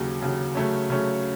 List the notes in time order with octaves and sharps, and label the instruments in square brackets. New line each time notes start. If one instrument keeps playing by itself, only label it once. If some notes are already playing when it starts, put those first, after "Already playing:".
Already playing: [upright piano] D#2 C#3 F#3
D#2 C#3 F#3
C#3 F#3 A3 C#4
C#3 F#3 A3 C#4